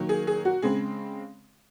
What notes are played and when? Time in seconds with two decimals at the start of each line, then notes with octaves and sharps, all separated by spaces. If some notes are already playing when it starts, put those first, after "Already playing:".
Already playing: D#3 F#3 A#3
0.09 G#4
0.27 G#4
0.45 F#4
0.62 C#3 G#3 C4 G#4